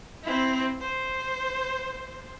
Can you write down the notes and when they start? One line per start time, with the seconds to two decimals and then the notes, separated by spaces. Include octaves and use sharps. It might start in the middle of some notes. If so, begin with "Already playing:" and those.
0.23 C4 E4
0.81 C5